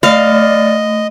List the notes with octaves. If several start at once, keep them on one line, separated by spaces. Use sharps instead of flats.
A3 D5 D#5 F5